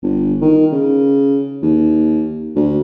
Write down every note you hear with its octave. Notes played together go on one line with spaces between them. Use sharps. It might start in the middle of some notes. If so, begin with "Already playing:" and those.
G1
D#3
C#3
D#2
D2